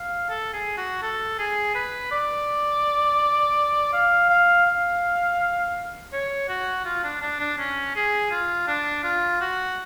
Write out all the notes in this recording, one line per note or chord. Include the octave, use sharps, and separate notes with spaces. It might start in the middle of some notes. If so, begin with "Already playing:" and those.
Already playing: F5
A4
G#4
F#4
A4
G#4
B4
D5
F5
F5
F5
C#5
F#4
F4
D4
D4
D4
C#4
G#4
F4
D4
F4
F#4